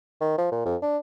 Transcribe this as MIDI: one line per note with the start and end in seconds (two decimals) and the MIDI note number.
0.21 0.35 51
0.38 0.48 53
0.52 0.61 46
0.65 0.76 41
0.82 0.98 62